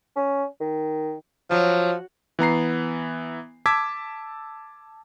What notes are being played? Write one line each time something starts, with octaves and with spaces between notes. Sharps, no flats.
C#4
D#3
F3 F#3
E3 B3 A#5 C7
A5 D6 E6 G#6 B6